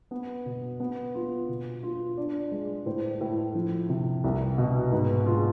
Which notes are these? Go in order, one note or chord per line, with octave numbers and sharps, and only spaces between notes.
B3
B2
B3
F4
B2
F4
D4 D5
G#3
A2 C5
A2
F3
C3
C2
B2
G#2 B4
F4 G#4